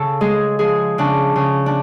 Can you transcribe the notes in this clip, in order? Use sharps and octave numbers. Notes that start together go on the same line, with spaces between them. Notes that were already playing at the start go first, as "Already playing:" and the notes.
Already playing: C#3 A4
G#3 G#4
F3 G#4
C#3 D4
C#3
D4